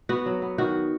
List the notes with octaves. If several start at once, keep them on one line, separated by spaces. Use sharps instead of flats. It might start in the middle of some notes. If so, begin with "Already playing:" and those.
B3 F#4
F#3
B3
D#3 F#4